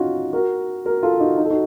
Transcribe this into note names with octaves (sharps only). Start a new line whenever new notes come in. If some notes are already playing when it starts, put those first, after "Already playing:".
Already playing: C#4 D#4 F4 F#4
F#4 A#4
F#4 A#4
F4 A4
D#4 F#4
D#4
A4
D#4 F#4